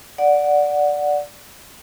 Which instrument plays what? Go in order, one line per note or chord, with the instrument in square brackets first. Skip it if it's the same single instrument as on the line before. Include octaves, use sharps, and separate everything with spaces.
[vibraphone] D5 F#5